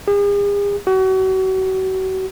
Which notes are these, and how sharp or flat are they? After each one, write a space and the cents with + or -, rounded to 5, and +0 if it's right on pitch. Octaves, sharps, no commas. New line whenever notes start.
G#4 -45
F#4 +35